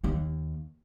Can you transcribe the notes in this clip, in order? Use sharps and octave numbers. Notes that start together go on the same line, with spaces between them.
D#2 D#3